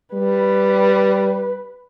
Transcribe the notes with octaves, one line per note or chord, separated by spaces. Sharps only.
G3 B4